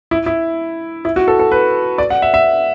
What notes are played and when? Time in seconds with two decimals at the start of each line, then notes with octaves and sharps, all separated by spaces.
0.11 E4
0.26 E4
1.05 E4
1.16 F#4
1.28 A4
1.39 A4
1.52 B4
1.98 D5
2.10 F#5
2.22 E5
2.34 E5